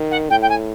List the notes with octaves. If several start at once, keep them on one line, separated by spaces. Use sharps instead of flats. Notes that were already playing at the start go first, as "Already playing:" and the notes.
Already playing: D#3
F#5
A2 G5
G5
G#5